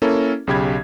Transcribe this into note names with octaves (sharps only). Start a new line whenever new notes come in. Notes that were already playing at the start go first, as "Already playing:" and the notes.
A#3 C#4 E4 A4 A#4
B1 C#3 G4 B5 G#6